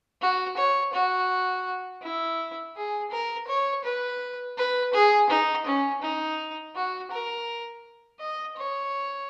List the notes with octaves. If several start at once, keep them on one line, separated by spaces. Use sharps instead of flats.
F#4
C#5
F#4
E4
G#4
A#4
C#5
B4
B4
G#4
D#4
C#4
D#4
F#4
A#4
D#5
C#5